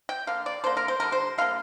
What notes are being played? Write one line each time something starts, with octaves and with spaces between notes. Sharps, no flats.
G5
D3 A#3 F5
D5
D3 A#3 C5
A#4
C5
D3 G3 A#3 A#4
C5
D3 G3 A#3 F5